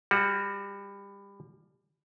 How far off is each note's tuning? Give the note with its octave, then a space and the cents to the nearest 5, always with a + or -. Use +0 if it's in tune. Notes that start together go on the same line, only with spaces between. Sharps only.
G3 +25 F#4 -5